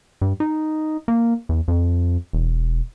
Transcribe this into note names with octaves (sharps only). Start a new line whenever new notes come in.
G2
D#4
A#3
E2
F2
E1